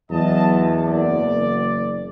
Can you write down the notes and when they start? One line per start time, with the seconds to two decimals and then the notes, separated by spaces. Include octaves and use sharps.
0.11 E2 F#3 D#5 A5
0.85 F#1 D5